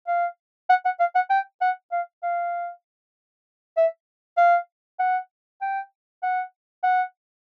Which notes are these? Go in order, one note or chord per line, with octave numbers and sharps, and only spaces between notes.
F5
F#5
F#5
F5
F#5
G5
F#5
F5
F5
E5
F5
F#5
G5
F#5
F#5